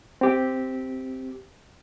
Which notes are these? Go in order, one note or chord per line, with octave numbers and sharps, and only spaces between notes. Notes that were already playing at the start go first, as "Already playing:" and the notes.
C4 G4